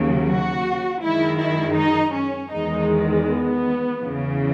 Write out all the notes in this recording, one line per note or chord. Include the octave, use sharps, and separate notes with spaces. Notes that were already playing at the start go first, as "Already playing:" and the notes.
Already playing: D#2 C#3 F#3
F#4
F#2 D#3 G#3 E4
E4
D#4
C#4
E2 D#3 G#3 D#4
B3
E2 C#3 E3